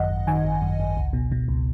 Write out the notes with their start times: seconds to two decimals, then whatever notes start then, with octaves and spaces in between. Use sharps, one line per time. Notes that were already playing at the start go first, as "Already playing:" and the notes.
Already playing: G#1 F#2 D#3 D#5 F#5
0.10 G#1
0.27 D#3 G#5
0.45 G#1
0.62 F#2
0.80 G#1
0.97 C#2
1.13 B2
1.32 B2
1.48 C#2